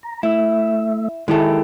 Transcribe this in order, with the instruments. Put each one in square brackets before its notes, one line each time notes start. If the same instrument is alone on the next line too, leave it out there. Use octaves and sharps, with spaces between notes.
[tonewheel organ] A#5
[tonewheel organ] A3 E5 [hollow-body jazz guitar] E4
[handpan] D#3 E4 [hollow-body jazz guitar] G#3 G4 A4